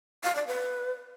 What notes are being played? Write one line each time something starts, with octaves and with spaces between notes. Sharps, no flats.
F5
D5
B4